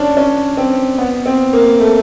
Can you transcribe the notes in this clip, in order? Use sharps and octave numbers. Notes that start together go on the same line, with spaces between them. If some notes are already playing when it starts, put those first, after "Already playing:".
Already playing: C#4 D4
C#4
C4
B3
C4
A#3
A3